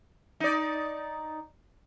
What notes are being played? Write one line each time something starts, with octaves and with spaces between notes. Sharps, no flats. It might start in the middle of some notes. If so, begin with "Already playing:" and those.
D#4 D5